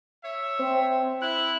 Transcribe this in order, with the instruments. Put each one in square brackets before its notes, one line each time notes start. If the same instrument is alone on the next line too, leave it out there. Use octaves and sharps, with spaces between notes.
[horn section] C#5 E5
[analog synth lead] C4
[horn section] E4 [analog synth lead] F#6